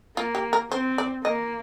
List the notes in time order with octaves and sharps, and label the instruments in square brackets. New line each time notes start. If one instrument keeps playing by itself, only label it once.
[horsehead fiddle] A#3 [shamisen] F4
[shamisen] G4
A#4
[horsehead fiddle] C4 [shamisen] C5
[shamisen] D5
[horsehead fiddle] A#3 [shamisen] D#5